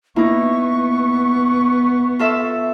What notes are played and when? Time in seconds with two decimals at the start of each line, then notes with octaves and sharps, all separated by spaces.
0.16 A#3 B3 D#4 E4 C#6
2.19 F4 A4 E5